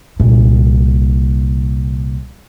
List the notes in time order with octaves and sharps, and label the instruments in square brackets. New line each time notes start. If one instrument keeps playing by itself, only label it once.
[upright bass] C2 A#2